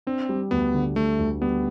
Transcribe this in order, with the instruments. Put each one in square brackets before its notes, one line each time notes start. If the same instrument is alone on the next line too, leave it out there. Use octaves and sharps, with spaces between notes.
[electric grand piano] C4 [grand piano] D4
[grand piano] G3
[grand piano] D2 [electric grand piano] B3
[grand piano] D3
[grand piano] D3 [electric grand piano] A3
[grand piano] D2
[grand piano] G3 [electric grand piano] B3